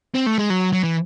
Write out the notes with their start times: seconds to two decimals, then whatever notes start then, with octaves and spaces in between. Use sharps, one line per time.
0.14 C4
0.26 A3
0.38 G#3
0.50 F#3
0.73 F#3
0.83 E3